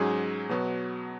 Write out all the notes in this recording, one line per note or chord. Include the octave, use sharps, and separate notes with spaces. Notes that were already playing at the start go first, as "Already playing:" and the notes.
Already playing: G#2 F#3 C#4 G#4
B2 F#3 B3 F#4